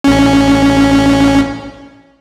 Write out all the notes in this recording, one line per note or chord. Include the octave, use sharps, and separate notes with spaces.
A1 C#4